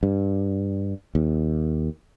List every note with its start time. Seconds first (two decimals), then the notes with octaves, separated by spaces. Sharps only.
0.03 G2
1.15 D#2